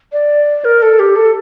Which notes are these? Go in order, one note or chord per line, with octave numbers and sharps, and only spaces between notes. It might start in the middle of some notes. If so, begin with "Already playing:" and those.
D5
A#4
A4
G4
A4